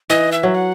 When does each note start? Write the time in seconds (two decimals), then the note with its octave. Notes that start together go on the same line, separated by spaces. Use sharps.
0.10 E3 D#5
0.32 E5
0.43 F#3
0.55 F#5